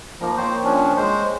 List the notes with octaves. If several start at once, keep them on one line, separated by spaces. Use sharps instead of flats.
F3 A#3 D#4 A#5
C5 C#5 G5 A5
F3 C#4 D4
G#3 C5